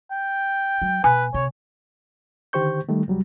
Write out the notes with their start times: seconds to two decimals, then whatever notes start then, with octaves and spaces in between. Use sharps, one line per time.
0.11 G5
0.82 F#3
1.04 B2 B4 G#5
1.34 C3 C#5
2.53 D3 D#3 G4 C5 C#6 G6
2.89 D#3 G3 A3
3.08 C2 F#3 G3